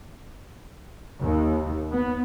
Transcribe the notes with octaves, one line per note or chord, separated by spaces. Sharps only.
D#2
B3